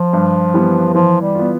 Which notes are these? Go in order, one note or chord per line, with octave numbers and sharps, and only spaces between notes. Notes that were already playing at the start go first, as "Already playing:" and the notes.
Already playing: F3
G2
E3 G3 B3
E3 F3
G3
B3 F4